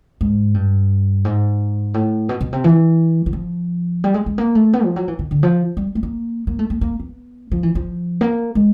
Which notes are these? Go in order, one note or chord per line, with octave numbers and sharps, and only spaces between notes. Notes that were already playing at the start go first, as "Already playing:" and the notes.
G#2
G2
G#2
A2
B2
B2
C3
E3
E3
F3
G3
G#3
G#3
A#3
A3
B3
F3
F#3
E3
D#3
D3
F3
G3
A3
A#3
A#3
A3
A#3
A#3
B3
F3
E3
F3
A#3
G#3